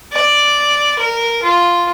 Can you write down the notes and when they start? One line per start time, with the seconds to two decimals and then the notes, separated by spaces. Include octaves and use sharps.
0.13 D5
0.99 A#4
1.43 F4